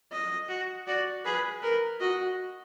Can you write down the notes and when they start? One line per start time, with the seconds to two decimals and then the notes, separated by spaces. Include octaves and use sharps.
0.12 D#5
0.49 F#4
0.87 F#4 D5
1.25 G#4 B4
1.62 A#4 B4
2.01 F#4 D#5